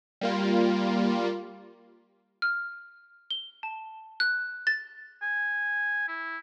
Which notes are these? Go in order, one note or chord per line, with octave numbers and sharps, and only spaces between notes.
G3 A#3 F4
F6
G7
A5
F#6
A6
G#5
E4